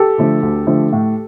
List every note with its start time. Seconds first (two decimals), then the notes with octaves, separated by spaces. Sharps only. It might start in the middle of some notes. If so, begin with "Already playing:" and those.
Already playing: G4 A4
0.18 D3 F3 A3
0.42 D2
0.67 D3 F3 A3
0.92 A2